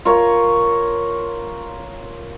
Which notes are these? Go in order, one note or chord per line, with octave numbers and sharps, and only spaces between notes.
F4 A#4 C#5